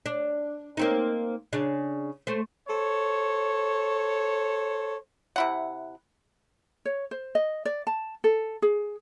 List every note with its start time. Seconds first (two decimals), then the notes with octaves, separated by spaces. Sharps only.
0.06 D4
0.77 A#3 C4 D#4
1.53 C#3 D4
2.27 A3 C5
2.68 A4 C5 C#5
5.36 C3 E4 F#5
6.85 C#5
7.11 C5
7.35 D#5
7.65 D5
7.87 A5
8.24 A4
8.62 G#4